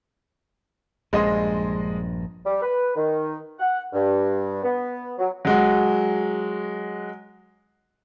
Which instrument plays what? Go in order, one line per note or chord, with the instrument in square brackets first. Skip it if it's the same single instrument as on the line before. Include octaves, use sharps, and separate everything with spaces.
[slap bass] A#1 G2 [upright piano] G#3 D#5 C6
[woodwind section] G3
B4
D#3
F#5
G2
B3
F#3
[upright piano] F#3 G#3 F#4